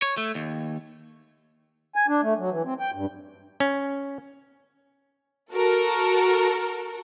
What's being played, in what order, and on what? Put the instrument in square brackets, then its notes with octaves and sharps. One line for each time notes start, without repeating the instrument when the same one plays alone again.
[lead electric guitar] C#5
A3
D#2
[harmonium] G#5
D4
A3
F#3
E3
C4
G5
G2
[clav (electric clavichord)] C#4
[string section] F#4 A4 A#4